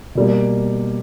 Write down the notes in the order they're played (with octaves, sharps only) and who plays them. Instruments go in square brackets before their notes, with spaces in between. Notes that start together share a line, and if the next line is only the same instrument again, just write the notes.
[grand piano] B2 G3 A#3